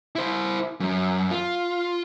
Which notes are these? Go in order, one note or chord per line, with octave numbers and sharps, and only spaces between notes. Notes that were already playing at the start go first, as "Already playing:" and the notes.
E4 C5
F#2
F4